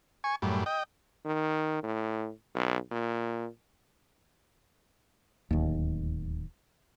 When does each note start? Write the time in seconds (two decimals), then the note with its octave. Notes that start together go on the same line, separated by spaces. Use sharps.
0.24 G#5 C#6
0.42 F#2 A2 G3
0.66 D#5 G5
1.25 D#3
1.83 A2
2.55 B1
2.91 A#2
5.51 D1 D#2